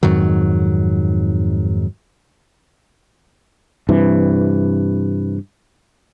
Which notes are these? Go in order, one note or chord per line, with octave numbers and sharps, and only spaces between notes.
F2 G#2 D#3 F#3
G2 C3 E3